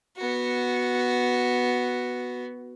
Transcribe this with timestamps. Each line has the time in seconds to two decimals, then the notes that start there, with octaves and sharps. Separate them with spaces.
0.17 B3 F#4